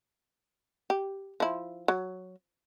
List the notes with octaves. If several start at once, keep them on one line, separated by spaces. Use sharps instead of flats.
G4
F3 E4
F#3